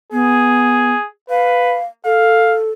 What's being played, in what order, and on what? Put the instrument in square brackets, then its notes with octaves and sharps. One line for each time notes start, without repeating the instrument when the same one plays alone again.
[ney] B3 [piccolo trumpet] G#4
[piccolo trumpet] B4 [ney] F5
[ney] A4 [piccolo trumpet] F5